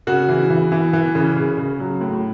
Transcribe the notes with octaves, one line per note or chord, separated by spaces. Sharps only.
C#3 F#4
E3
E3
E3
E3
C#3
C#3
C#3
F#3
A2